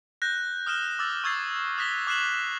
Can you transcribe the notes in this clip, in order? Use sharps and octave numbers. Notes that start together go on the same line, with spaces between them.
F#6 G6 A#6
D#6 F6 F#6 E7 G7
D6 E6 A6
C#6 E6 G#6 A6 C7
D#6 F#6 A#6 B6 F7 G7
D6 F#6 C7 E7 F#7